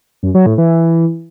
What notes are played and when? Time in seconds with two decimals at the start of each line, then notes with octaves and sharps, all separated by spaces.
0.23 F#2
0.35 F#3
0.46 A2
0.58 E3